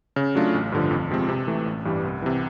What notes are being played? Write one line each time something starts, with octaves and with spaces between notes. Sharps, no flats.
C#3
F#3 A3 D4 F4
A1
G2 D3 F3
F2
C3 F3 G#3 C4
C3
E3 A3
A1
G2 E3 G3
C2
C3 E3